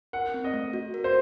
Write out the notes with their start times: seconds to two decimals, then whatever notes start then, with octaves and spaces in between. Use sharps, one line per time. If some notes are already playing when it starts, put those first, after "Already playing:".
0.13 A#4 F#5
0.34 C4
0.44 D#5
0.54 A3
0.73 F#4
0.94 A#4
1.04 C5